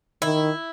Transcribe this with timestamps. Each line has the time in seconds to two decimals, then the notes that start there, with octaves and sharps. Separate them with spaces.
0.22 D#3 E4